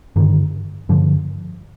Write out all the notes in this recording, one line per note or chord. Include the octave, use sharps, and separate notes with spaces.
G2 D3 D#3
G2 D3 F3